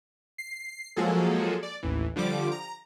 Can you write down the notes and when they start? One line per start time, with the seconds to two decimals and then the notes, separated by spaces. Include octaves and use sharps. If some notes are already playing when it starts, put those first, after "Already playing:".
0.38 C7
0.96 F3 F#3 G#3 A#3 G#4 A4
1.63 D5
1.83 A1 D#2 E3
2.16 D3 F3 G3 D6
2.52 A#5